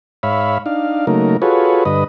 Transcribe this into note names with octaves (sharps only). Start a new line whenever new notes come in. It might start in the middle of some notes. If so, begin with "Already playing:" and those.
G#2 C#5 E5 F5 B5
D4 D#4 F5
C#3 F#3 A3 A#3 D#4 A#4
F4 F#4 G#4 A4 B4 C#5
G2 D3 B4 D#5